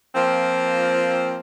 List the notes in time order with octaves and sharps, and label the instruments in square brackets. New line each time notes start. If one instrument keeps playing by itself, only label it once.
[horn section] F3 A#3 C4